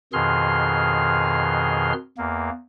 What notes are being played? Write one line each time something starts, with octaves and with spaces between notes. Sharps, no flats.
F2 B2 D#3 G#4 C6 F6
E2 A#3